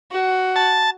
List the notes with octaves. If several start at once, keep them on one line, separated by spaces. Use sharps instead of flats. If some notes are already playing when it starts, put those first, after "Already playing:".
F#4
A5